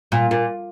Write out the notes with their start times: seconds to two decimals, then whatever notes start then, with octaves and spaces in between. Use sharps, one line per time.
0.12 A#2
0.31 A#2